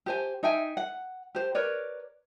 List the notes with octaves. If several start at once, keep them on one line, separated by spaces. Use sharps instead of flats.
G4 C5 G#5
D#4 E5 G5 G#5
F#5
G4 C5
A#4 B4 C#5 D5